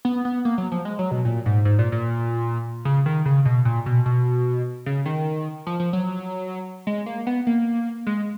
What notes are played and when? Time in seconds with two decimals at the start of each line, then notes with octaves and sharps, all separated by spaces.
0.05 B3
0.25 B3
0.45 A#3
0.58 F#3
0.72 F3
0.85 G#3
0.99 F#3
1.11 B2
1.25 A#2
1.46 G#2
1.65 G#2
1.79 A#2
1.92 A#2
2.85 C#3
3.06 D#3
3.25 C#3
3.45 B2
3.65 A#2
3.86 B2
4.06 B2
4.86 C#3
5.06 D#3
5.67 F3
5.80 F3
5.93 F#3
6.87 G#3
7.06 A#3
7.27 B3
7.47 A#3
8.07 G#3